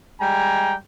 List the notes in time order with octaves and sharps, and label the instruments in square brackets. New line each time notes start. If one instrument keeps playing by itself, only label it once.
[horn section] G3 G#3 G5 G#5 A#5